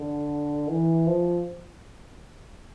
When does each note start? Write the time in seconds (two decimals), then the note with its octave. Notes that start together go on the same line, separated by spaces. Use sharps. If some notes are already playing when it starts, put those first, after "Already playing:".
Already playing: D3
0.68 E3
1.07 F3